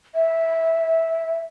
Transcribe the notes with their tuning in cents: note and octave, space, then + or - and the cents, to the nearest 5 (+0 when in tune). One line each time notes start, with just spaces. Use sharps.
E5 -10